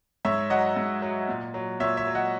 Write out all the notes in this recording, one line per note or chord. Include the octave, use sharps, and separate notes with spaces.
G#2 C#5 E5
F#3 D#5 F#5
G#2
F#3
A#2
F#3
A#2 C#5 E5
C#5 E5
F#3
D#5 F#5